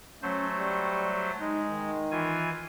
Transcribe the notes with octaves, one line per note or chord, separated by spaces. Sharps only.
F#3 A3 C#4 C5
G3
G#3 D#4
D#3
E3 F4 G#5